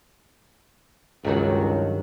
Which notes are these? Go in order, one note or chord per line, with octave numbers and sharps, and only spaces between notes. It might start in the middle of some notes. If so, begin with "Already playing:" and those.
C#2 G2 D#3 F#3